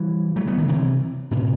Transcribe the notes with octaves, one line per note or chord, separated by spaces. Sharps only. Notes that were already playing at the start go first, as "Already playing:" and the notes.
Already playing: E3 G3
F#3 A3
G3 B3
D#3 F#3
C3 E3
A2 C3